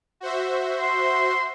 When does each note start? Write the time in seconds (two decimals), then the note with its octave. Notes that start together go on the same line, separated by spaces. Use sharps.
0.20 F#4 C5 E5
0.80 C6